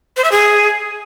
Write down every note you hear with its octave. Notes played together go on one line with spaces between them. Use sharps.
C5
E5
G#4